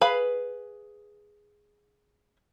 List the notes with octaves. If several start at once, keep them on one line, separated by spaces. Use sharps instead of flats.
G#4 B4 F5 B5